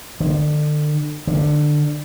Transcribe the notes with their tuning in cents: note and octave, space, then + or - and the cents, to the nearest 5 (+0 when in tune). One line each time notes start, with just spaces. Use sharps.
D3 +35
D3 +20